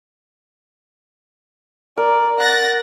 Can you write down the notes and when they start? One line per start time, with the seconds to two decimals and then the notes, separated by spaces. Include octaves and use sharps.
1.97 A#4 D5
2.40 F#5 F#6 A6 A#6